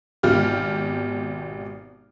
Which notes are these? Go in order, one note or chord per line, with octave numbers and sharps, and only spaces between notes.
G#1 B2 F4 G4 F6